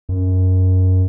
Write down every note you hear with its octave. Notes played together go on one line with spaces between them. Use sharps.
F#2